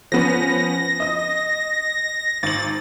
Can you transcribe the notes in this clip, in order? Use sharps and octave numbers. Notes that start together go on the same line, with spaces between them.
F3 B3 C#4 A#6
D#5 D#6
G#1 A6 F#7